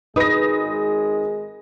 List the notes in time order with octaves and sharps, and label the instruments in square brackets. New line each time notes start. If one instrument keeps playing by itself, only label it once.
[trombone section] G#1 G#3 [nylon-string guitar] D#4 B4 [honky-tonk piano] D#6 A#6